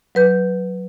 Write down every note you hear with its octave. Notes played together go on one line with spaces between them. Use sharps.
F#3 B4 G6